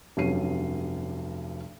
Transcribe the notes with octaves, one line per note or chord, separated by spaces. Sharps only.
F1 G2 F#3 C#4 C7 D#7